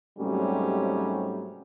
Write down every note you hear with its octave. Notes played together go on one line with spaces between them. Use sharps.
G#2 C3 F#3 G3 A3 C#4